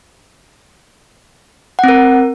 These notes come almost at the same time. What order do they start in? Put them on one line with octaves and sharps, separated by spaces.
F#5 C4 A#4